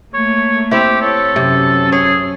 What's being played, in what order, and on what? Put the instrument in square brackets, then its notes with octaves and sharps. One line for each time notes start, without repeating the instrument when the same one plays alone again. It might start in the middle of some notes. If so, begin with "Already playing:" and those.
[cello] A3 A#3 [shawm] C#5
[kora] C4 E4 [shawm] G4
[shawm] A4 [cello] C#5
[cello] F#2 C#4 [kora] C3
[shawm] G#4 [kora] C#5